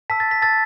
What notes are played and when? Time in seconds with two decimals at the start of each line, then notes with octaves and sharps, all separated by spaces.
0.10 A5 E6 B6
0.20 A6
0.31 B6
0.42 A5 E6 A6